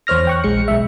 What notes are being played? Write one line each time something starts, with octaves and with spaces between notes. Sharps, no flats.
E2 C5 C#5 F6 A#6
G5 C#6 F#6
A#1 G#3 C#7
B1 G#3 E5